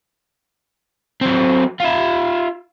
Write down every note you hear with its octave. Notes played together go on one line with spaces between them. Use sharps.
F#3 C4
F4 E5